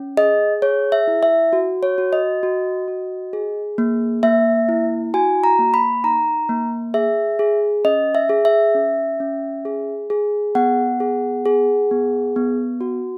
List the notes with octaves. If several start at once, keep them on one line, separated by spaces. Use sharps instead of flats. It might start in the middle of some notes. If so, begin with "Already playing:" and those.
Already playing: C#4
G#4 D#5
G#4 C#5
E5
E4
E5
F#4
C#5
F#4
D#5
F#4
F#4
G#4
A#3
A#3 E5
E4
F#4 G#5
A#5
A#3
B5
D#4 A#5
A#3
G#4 E5
G#4
C#4 D#5
E5
G#4
E5
C#4
C#4
G#4
G#4
B3 F#5
G#4
G#4
B3
B3
F#4